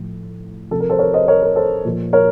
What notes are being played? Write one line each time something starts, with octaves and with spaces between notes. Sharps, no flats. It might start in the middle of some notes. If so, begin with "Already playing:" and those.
Already playing: A2 F3
C3 F3 A4
A#4
A4 C5
A#4 C#5
C5 D#5
A#4 C#5
A#4
A4 C5
A#2 F3
A#4 C#5